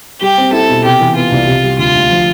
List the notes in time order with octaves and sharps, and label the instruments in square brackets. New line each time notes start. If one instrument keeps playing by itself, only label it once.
[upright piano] G3 [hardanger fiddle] G4
[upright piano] C4
[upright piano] E4 [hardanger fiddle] A4
[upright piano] B2
[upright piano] C3 [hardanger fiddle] G4
[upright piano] E3
[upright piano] B3 [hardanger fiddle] F4
[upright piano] C2
C3
G3
[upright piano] D2 [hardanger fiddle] F4
[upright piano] D2
F3